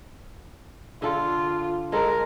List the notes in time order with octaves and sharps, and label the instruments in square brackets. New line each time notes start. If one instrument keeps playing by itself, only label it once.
[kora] D3 A4 [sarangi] F4
[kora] G#3 C4 A4 [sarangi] A#4